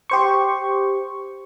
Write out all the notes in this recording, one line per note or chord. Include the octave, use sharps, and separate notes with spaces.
G4 C5 C#6